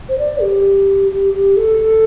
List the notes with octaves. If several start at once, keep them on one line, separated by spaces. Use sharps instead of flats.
C5
D5
G4
G4
G4
A4